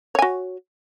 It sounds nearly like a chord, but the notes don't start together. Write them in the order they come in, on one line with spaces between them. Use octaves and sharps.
C#5 G#5 F#4